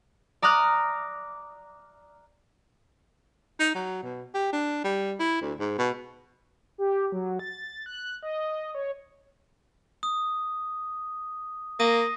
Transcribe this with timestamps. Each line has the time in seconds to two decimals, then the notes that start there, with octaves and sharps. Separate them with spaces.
0.42 D5 A#5 D#6 F6 F#6
3.60 D#4
3.75 F#3
4.03 B2
4.34 G4
4.53 D4
4.84 G3
5.19 E4
5.41 D2
5.59 G#2
5.78 B2
6.78 G4
7.12 F#3
7.39 A6
7.86 F#6
8.23 D#5
8.75 C#5
10.03 D#6
11.80 A#3 D#6 A#6 D#7